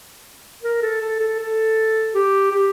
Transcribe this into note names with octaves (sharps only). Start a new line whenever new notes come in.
A#4
A4
A4
A4
A4
G4
G4